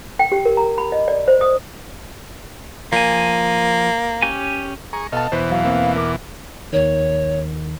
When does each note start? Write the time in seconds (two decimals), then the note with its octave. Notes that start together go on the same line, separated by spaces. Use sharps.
0.19 G5
0.32 G4
0.45 A#4
0.57 A#5
0.78 B5
0.92 D#5
1.08 D5
1.28 C5
1.41 D#6
2.92 F3 A#3 G#5
4.22 C#4 G4 G#5
4.93 G#4 A#5 C#6
5.12 B2 A4 D#5 F5 A5
5.32 E2 B2 E3 B4 C5
5.51 F#3 F5
5.65 A#3 C4
5.96 A#4 D6
6.73 D#2 D#3 C#5